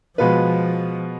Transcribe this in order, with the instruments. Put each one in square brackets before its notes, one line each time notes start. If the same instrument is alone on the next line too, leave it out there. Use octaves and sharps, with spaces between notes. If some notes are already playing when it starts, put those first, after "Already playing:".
[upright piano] B2 G#3 B3 F4 B4 [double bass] F3